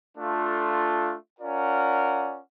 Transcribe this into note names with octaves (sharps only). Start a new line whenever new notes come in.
A3 D4 F4 A4
C#4 F4 A#4 D5 F#5